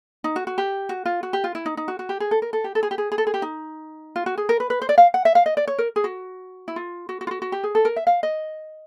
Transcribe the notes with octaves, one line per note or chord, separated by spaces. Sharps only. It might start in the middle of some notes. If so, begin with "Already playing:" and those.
D#4
F#4
F#4
G4
F#4
F4
F#4
G4
F4
E4
D#4
D#4
F#4
F#4
G4
G#4
A4
A#4
A4
G4
A4
G#4
G4
G#4
G#4
A4
G#4
G4
D#4
F4
F#4
G#4
A#4
B4
B4
C5
D5
F5
F#5
E5
F5
D#5
D5
C#5
A#4
G#4
F#4
E4
F4
F#4
F#4
F4
F#4
F#4
G4
G#4
A4
A#4
E5
F5
D#5